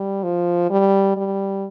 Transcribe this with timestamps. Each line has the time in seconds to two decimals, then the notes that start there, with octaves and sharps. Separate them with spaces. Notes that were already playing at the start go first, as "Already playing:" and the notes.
Already playing: G3
0.23 F3
0.70 G3
1.17 G3